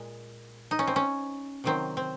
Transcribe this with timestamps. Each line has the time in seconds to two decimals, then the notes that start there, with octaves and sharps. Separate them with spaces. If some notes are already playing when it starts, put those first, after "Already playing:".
Already playing: A#2 G#3
0.71 D#4
0.79 C#4
0.87 C4
0.96 C#4
1.64 C3 D#3 F#3 C4
1.97 C4